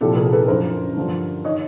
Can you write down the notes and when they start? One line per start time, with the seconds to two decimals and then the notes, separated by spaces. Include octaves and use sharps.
0.01 C2 A#2 F3 G4 A4
0.16 G#4 A#4
0.33 A4 B4
0.48 F#2 D3 F3 A#4 C5
0.96 G2 D3 F3
1.45 D#3 C#5 D#5